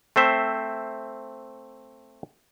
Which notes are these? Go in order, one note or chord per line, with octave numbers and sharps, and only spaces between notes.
A3 C4 C5 E5